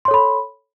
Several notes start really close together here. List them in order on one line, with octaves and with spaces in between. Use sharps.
C6 C#5 A4 B5